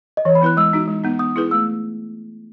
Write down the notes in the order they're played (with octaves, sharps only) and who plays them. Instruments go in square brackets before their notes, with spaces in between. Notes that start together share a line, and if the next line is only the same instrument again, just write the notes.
[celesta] D#5
[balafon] E3 [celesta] C#5
[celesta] B5
[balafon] B3 E4 B4 [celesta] F#6
[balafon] G#3 [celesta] E6
[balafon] D#4 F#4
G#3
B3 D#4
[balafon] B3 [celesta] D#6
[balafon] E4 G#4 B4
[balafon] A3 [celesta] E6